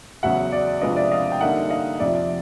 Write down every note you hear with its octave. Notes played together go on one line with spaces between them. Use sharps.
E2 C#3 F#3 E5 F#5
D5 E5
C3 F3 G#3 B3 D4 D#5 F5
D5 E5
D#5 F5
G5
D3 G3 A#3 D#4 E5 F#5
D#5 F5
F2 C3 F3 D5 E5